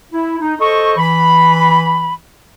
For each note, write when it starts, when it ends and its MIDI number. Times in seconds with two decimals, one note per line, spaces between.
0.12 0.40 64
0.41 0.55 63
0.61 0.95 69
0.61 0.95 72
0.61 0.95 75
0.61 0.95 85
0.97 2.15 52
0.97 2.15 83